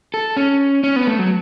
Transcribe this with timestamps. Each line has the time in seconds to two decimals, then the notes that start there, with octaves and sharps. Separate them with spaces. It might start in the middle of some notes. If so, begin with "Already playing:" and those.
0.14 A4
0.37 C#4
0.84 C#4
0.96 B3
1.07 A3
1.19 F#3